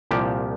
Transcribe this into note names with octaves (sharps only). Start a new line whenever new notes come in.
C2 A#2 F3 G4